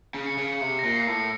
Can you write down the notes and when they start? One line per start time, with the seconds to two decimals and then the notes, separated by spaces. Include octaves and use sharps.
0.14 C#3
0.26 C#7
0.38 C#3
0.61 C3 C#7
0.79 A#6
0.84 A#2
0.96 C7
1.07 A2
1.12 C#7